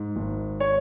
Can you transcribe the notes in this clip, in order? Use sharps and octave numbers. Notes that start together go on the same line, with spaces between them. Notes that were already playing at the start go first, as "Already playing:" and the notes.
Already playing: G#2
G#1
C#5